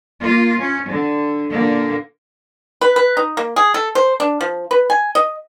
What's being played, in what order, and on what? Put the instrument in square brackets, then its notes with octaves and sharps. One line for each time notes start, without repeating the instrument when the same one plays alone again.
[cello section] A#3 F4
C#4
D3
A#2 D3 A#3
[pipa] B4
B4
D#4
A#3
G#4
A4
C5
D4
F3
B4
G#5
D#5